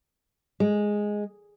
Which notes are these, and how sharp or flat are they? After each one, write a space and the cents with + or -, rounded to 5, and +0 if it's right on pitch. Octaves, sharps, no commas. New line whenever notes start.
G#3 +0